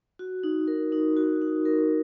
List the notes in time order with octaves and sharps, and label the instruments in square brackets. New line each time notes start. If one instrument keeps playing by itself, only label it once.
[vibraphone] F#4
D#4
A#4
D#4
F#4
D#4
A#4